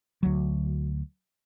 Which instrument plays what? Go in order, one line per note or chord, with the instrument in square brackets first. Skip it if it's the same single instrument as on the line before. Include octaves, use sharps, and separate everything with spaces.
[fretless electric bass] D2 F#3